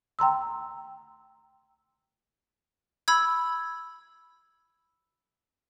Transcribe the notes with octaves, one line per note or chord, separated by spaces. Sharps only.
G5 A#5 C6 E6
B5 E6 G#6